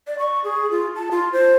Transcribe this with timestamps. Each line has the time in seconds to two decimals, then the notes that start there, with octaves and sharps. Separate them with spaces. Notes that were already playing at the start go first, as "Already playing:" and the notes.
0.07 D5
0.19 C#6
0.44 G#4
0.71 F4
0.96 A5
1.11 F4
1.33 C5